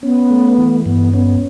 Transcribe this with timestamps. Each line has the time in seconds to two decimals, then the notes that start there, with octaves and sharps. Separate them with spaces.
0.02 B3 C#4
0.31 A3
0.58 E3
0.86 G2 B3
1.13 B3 C#4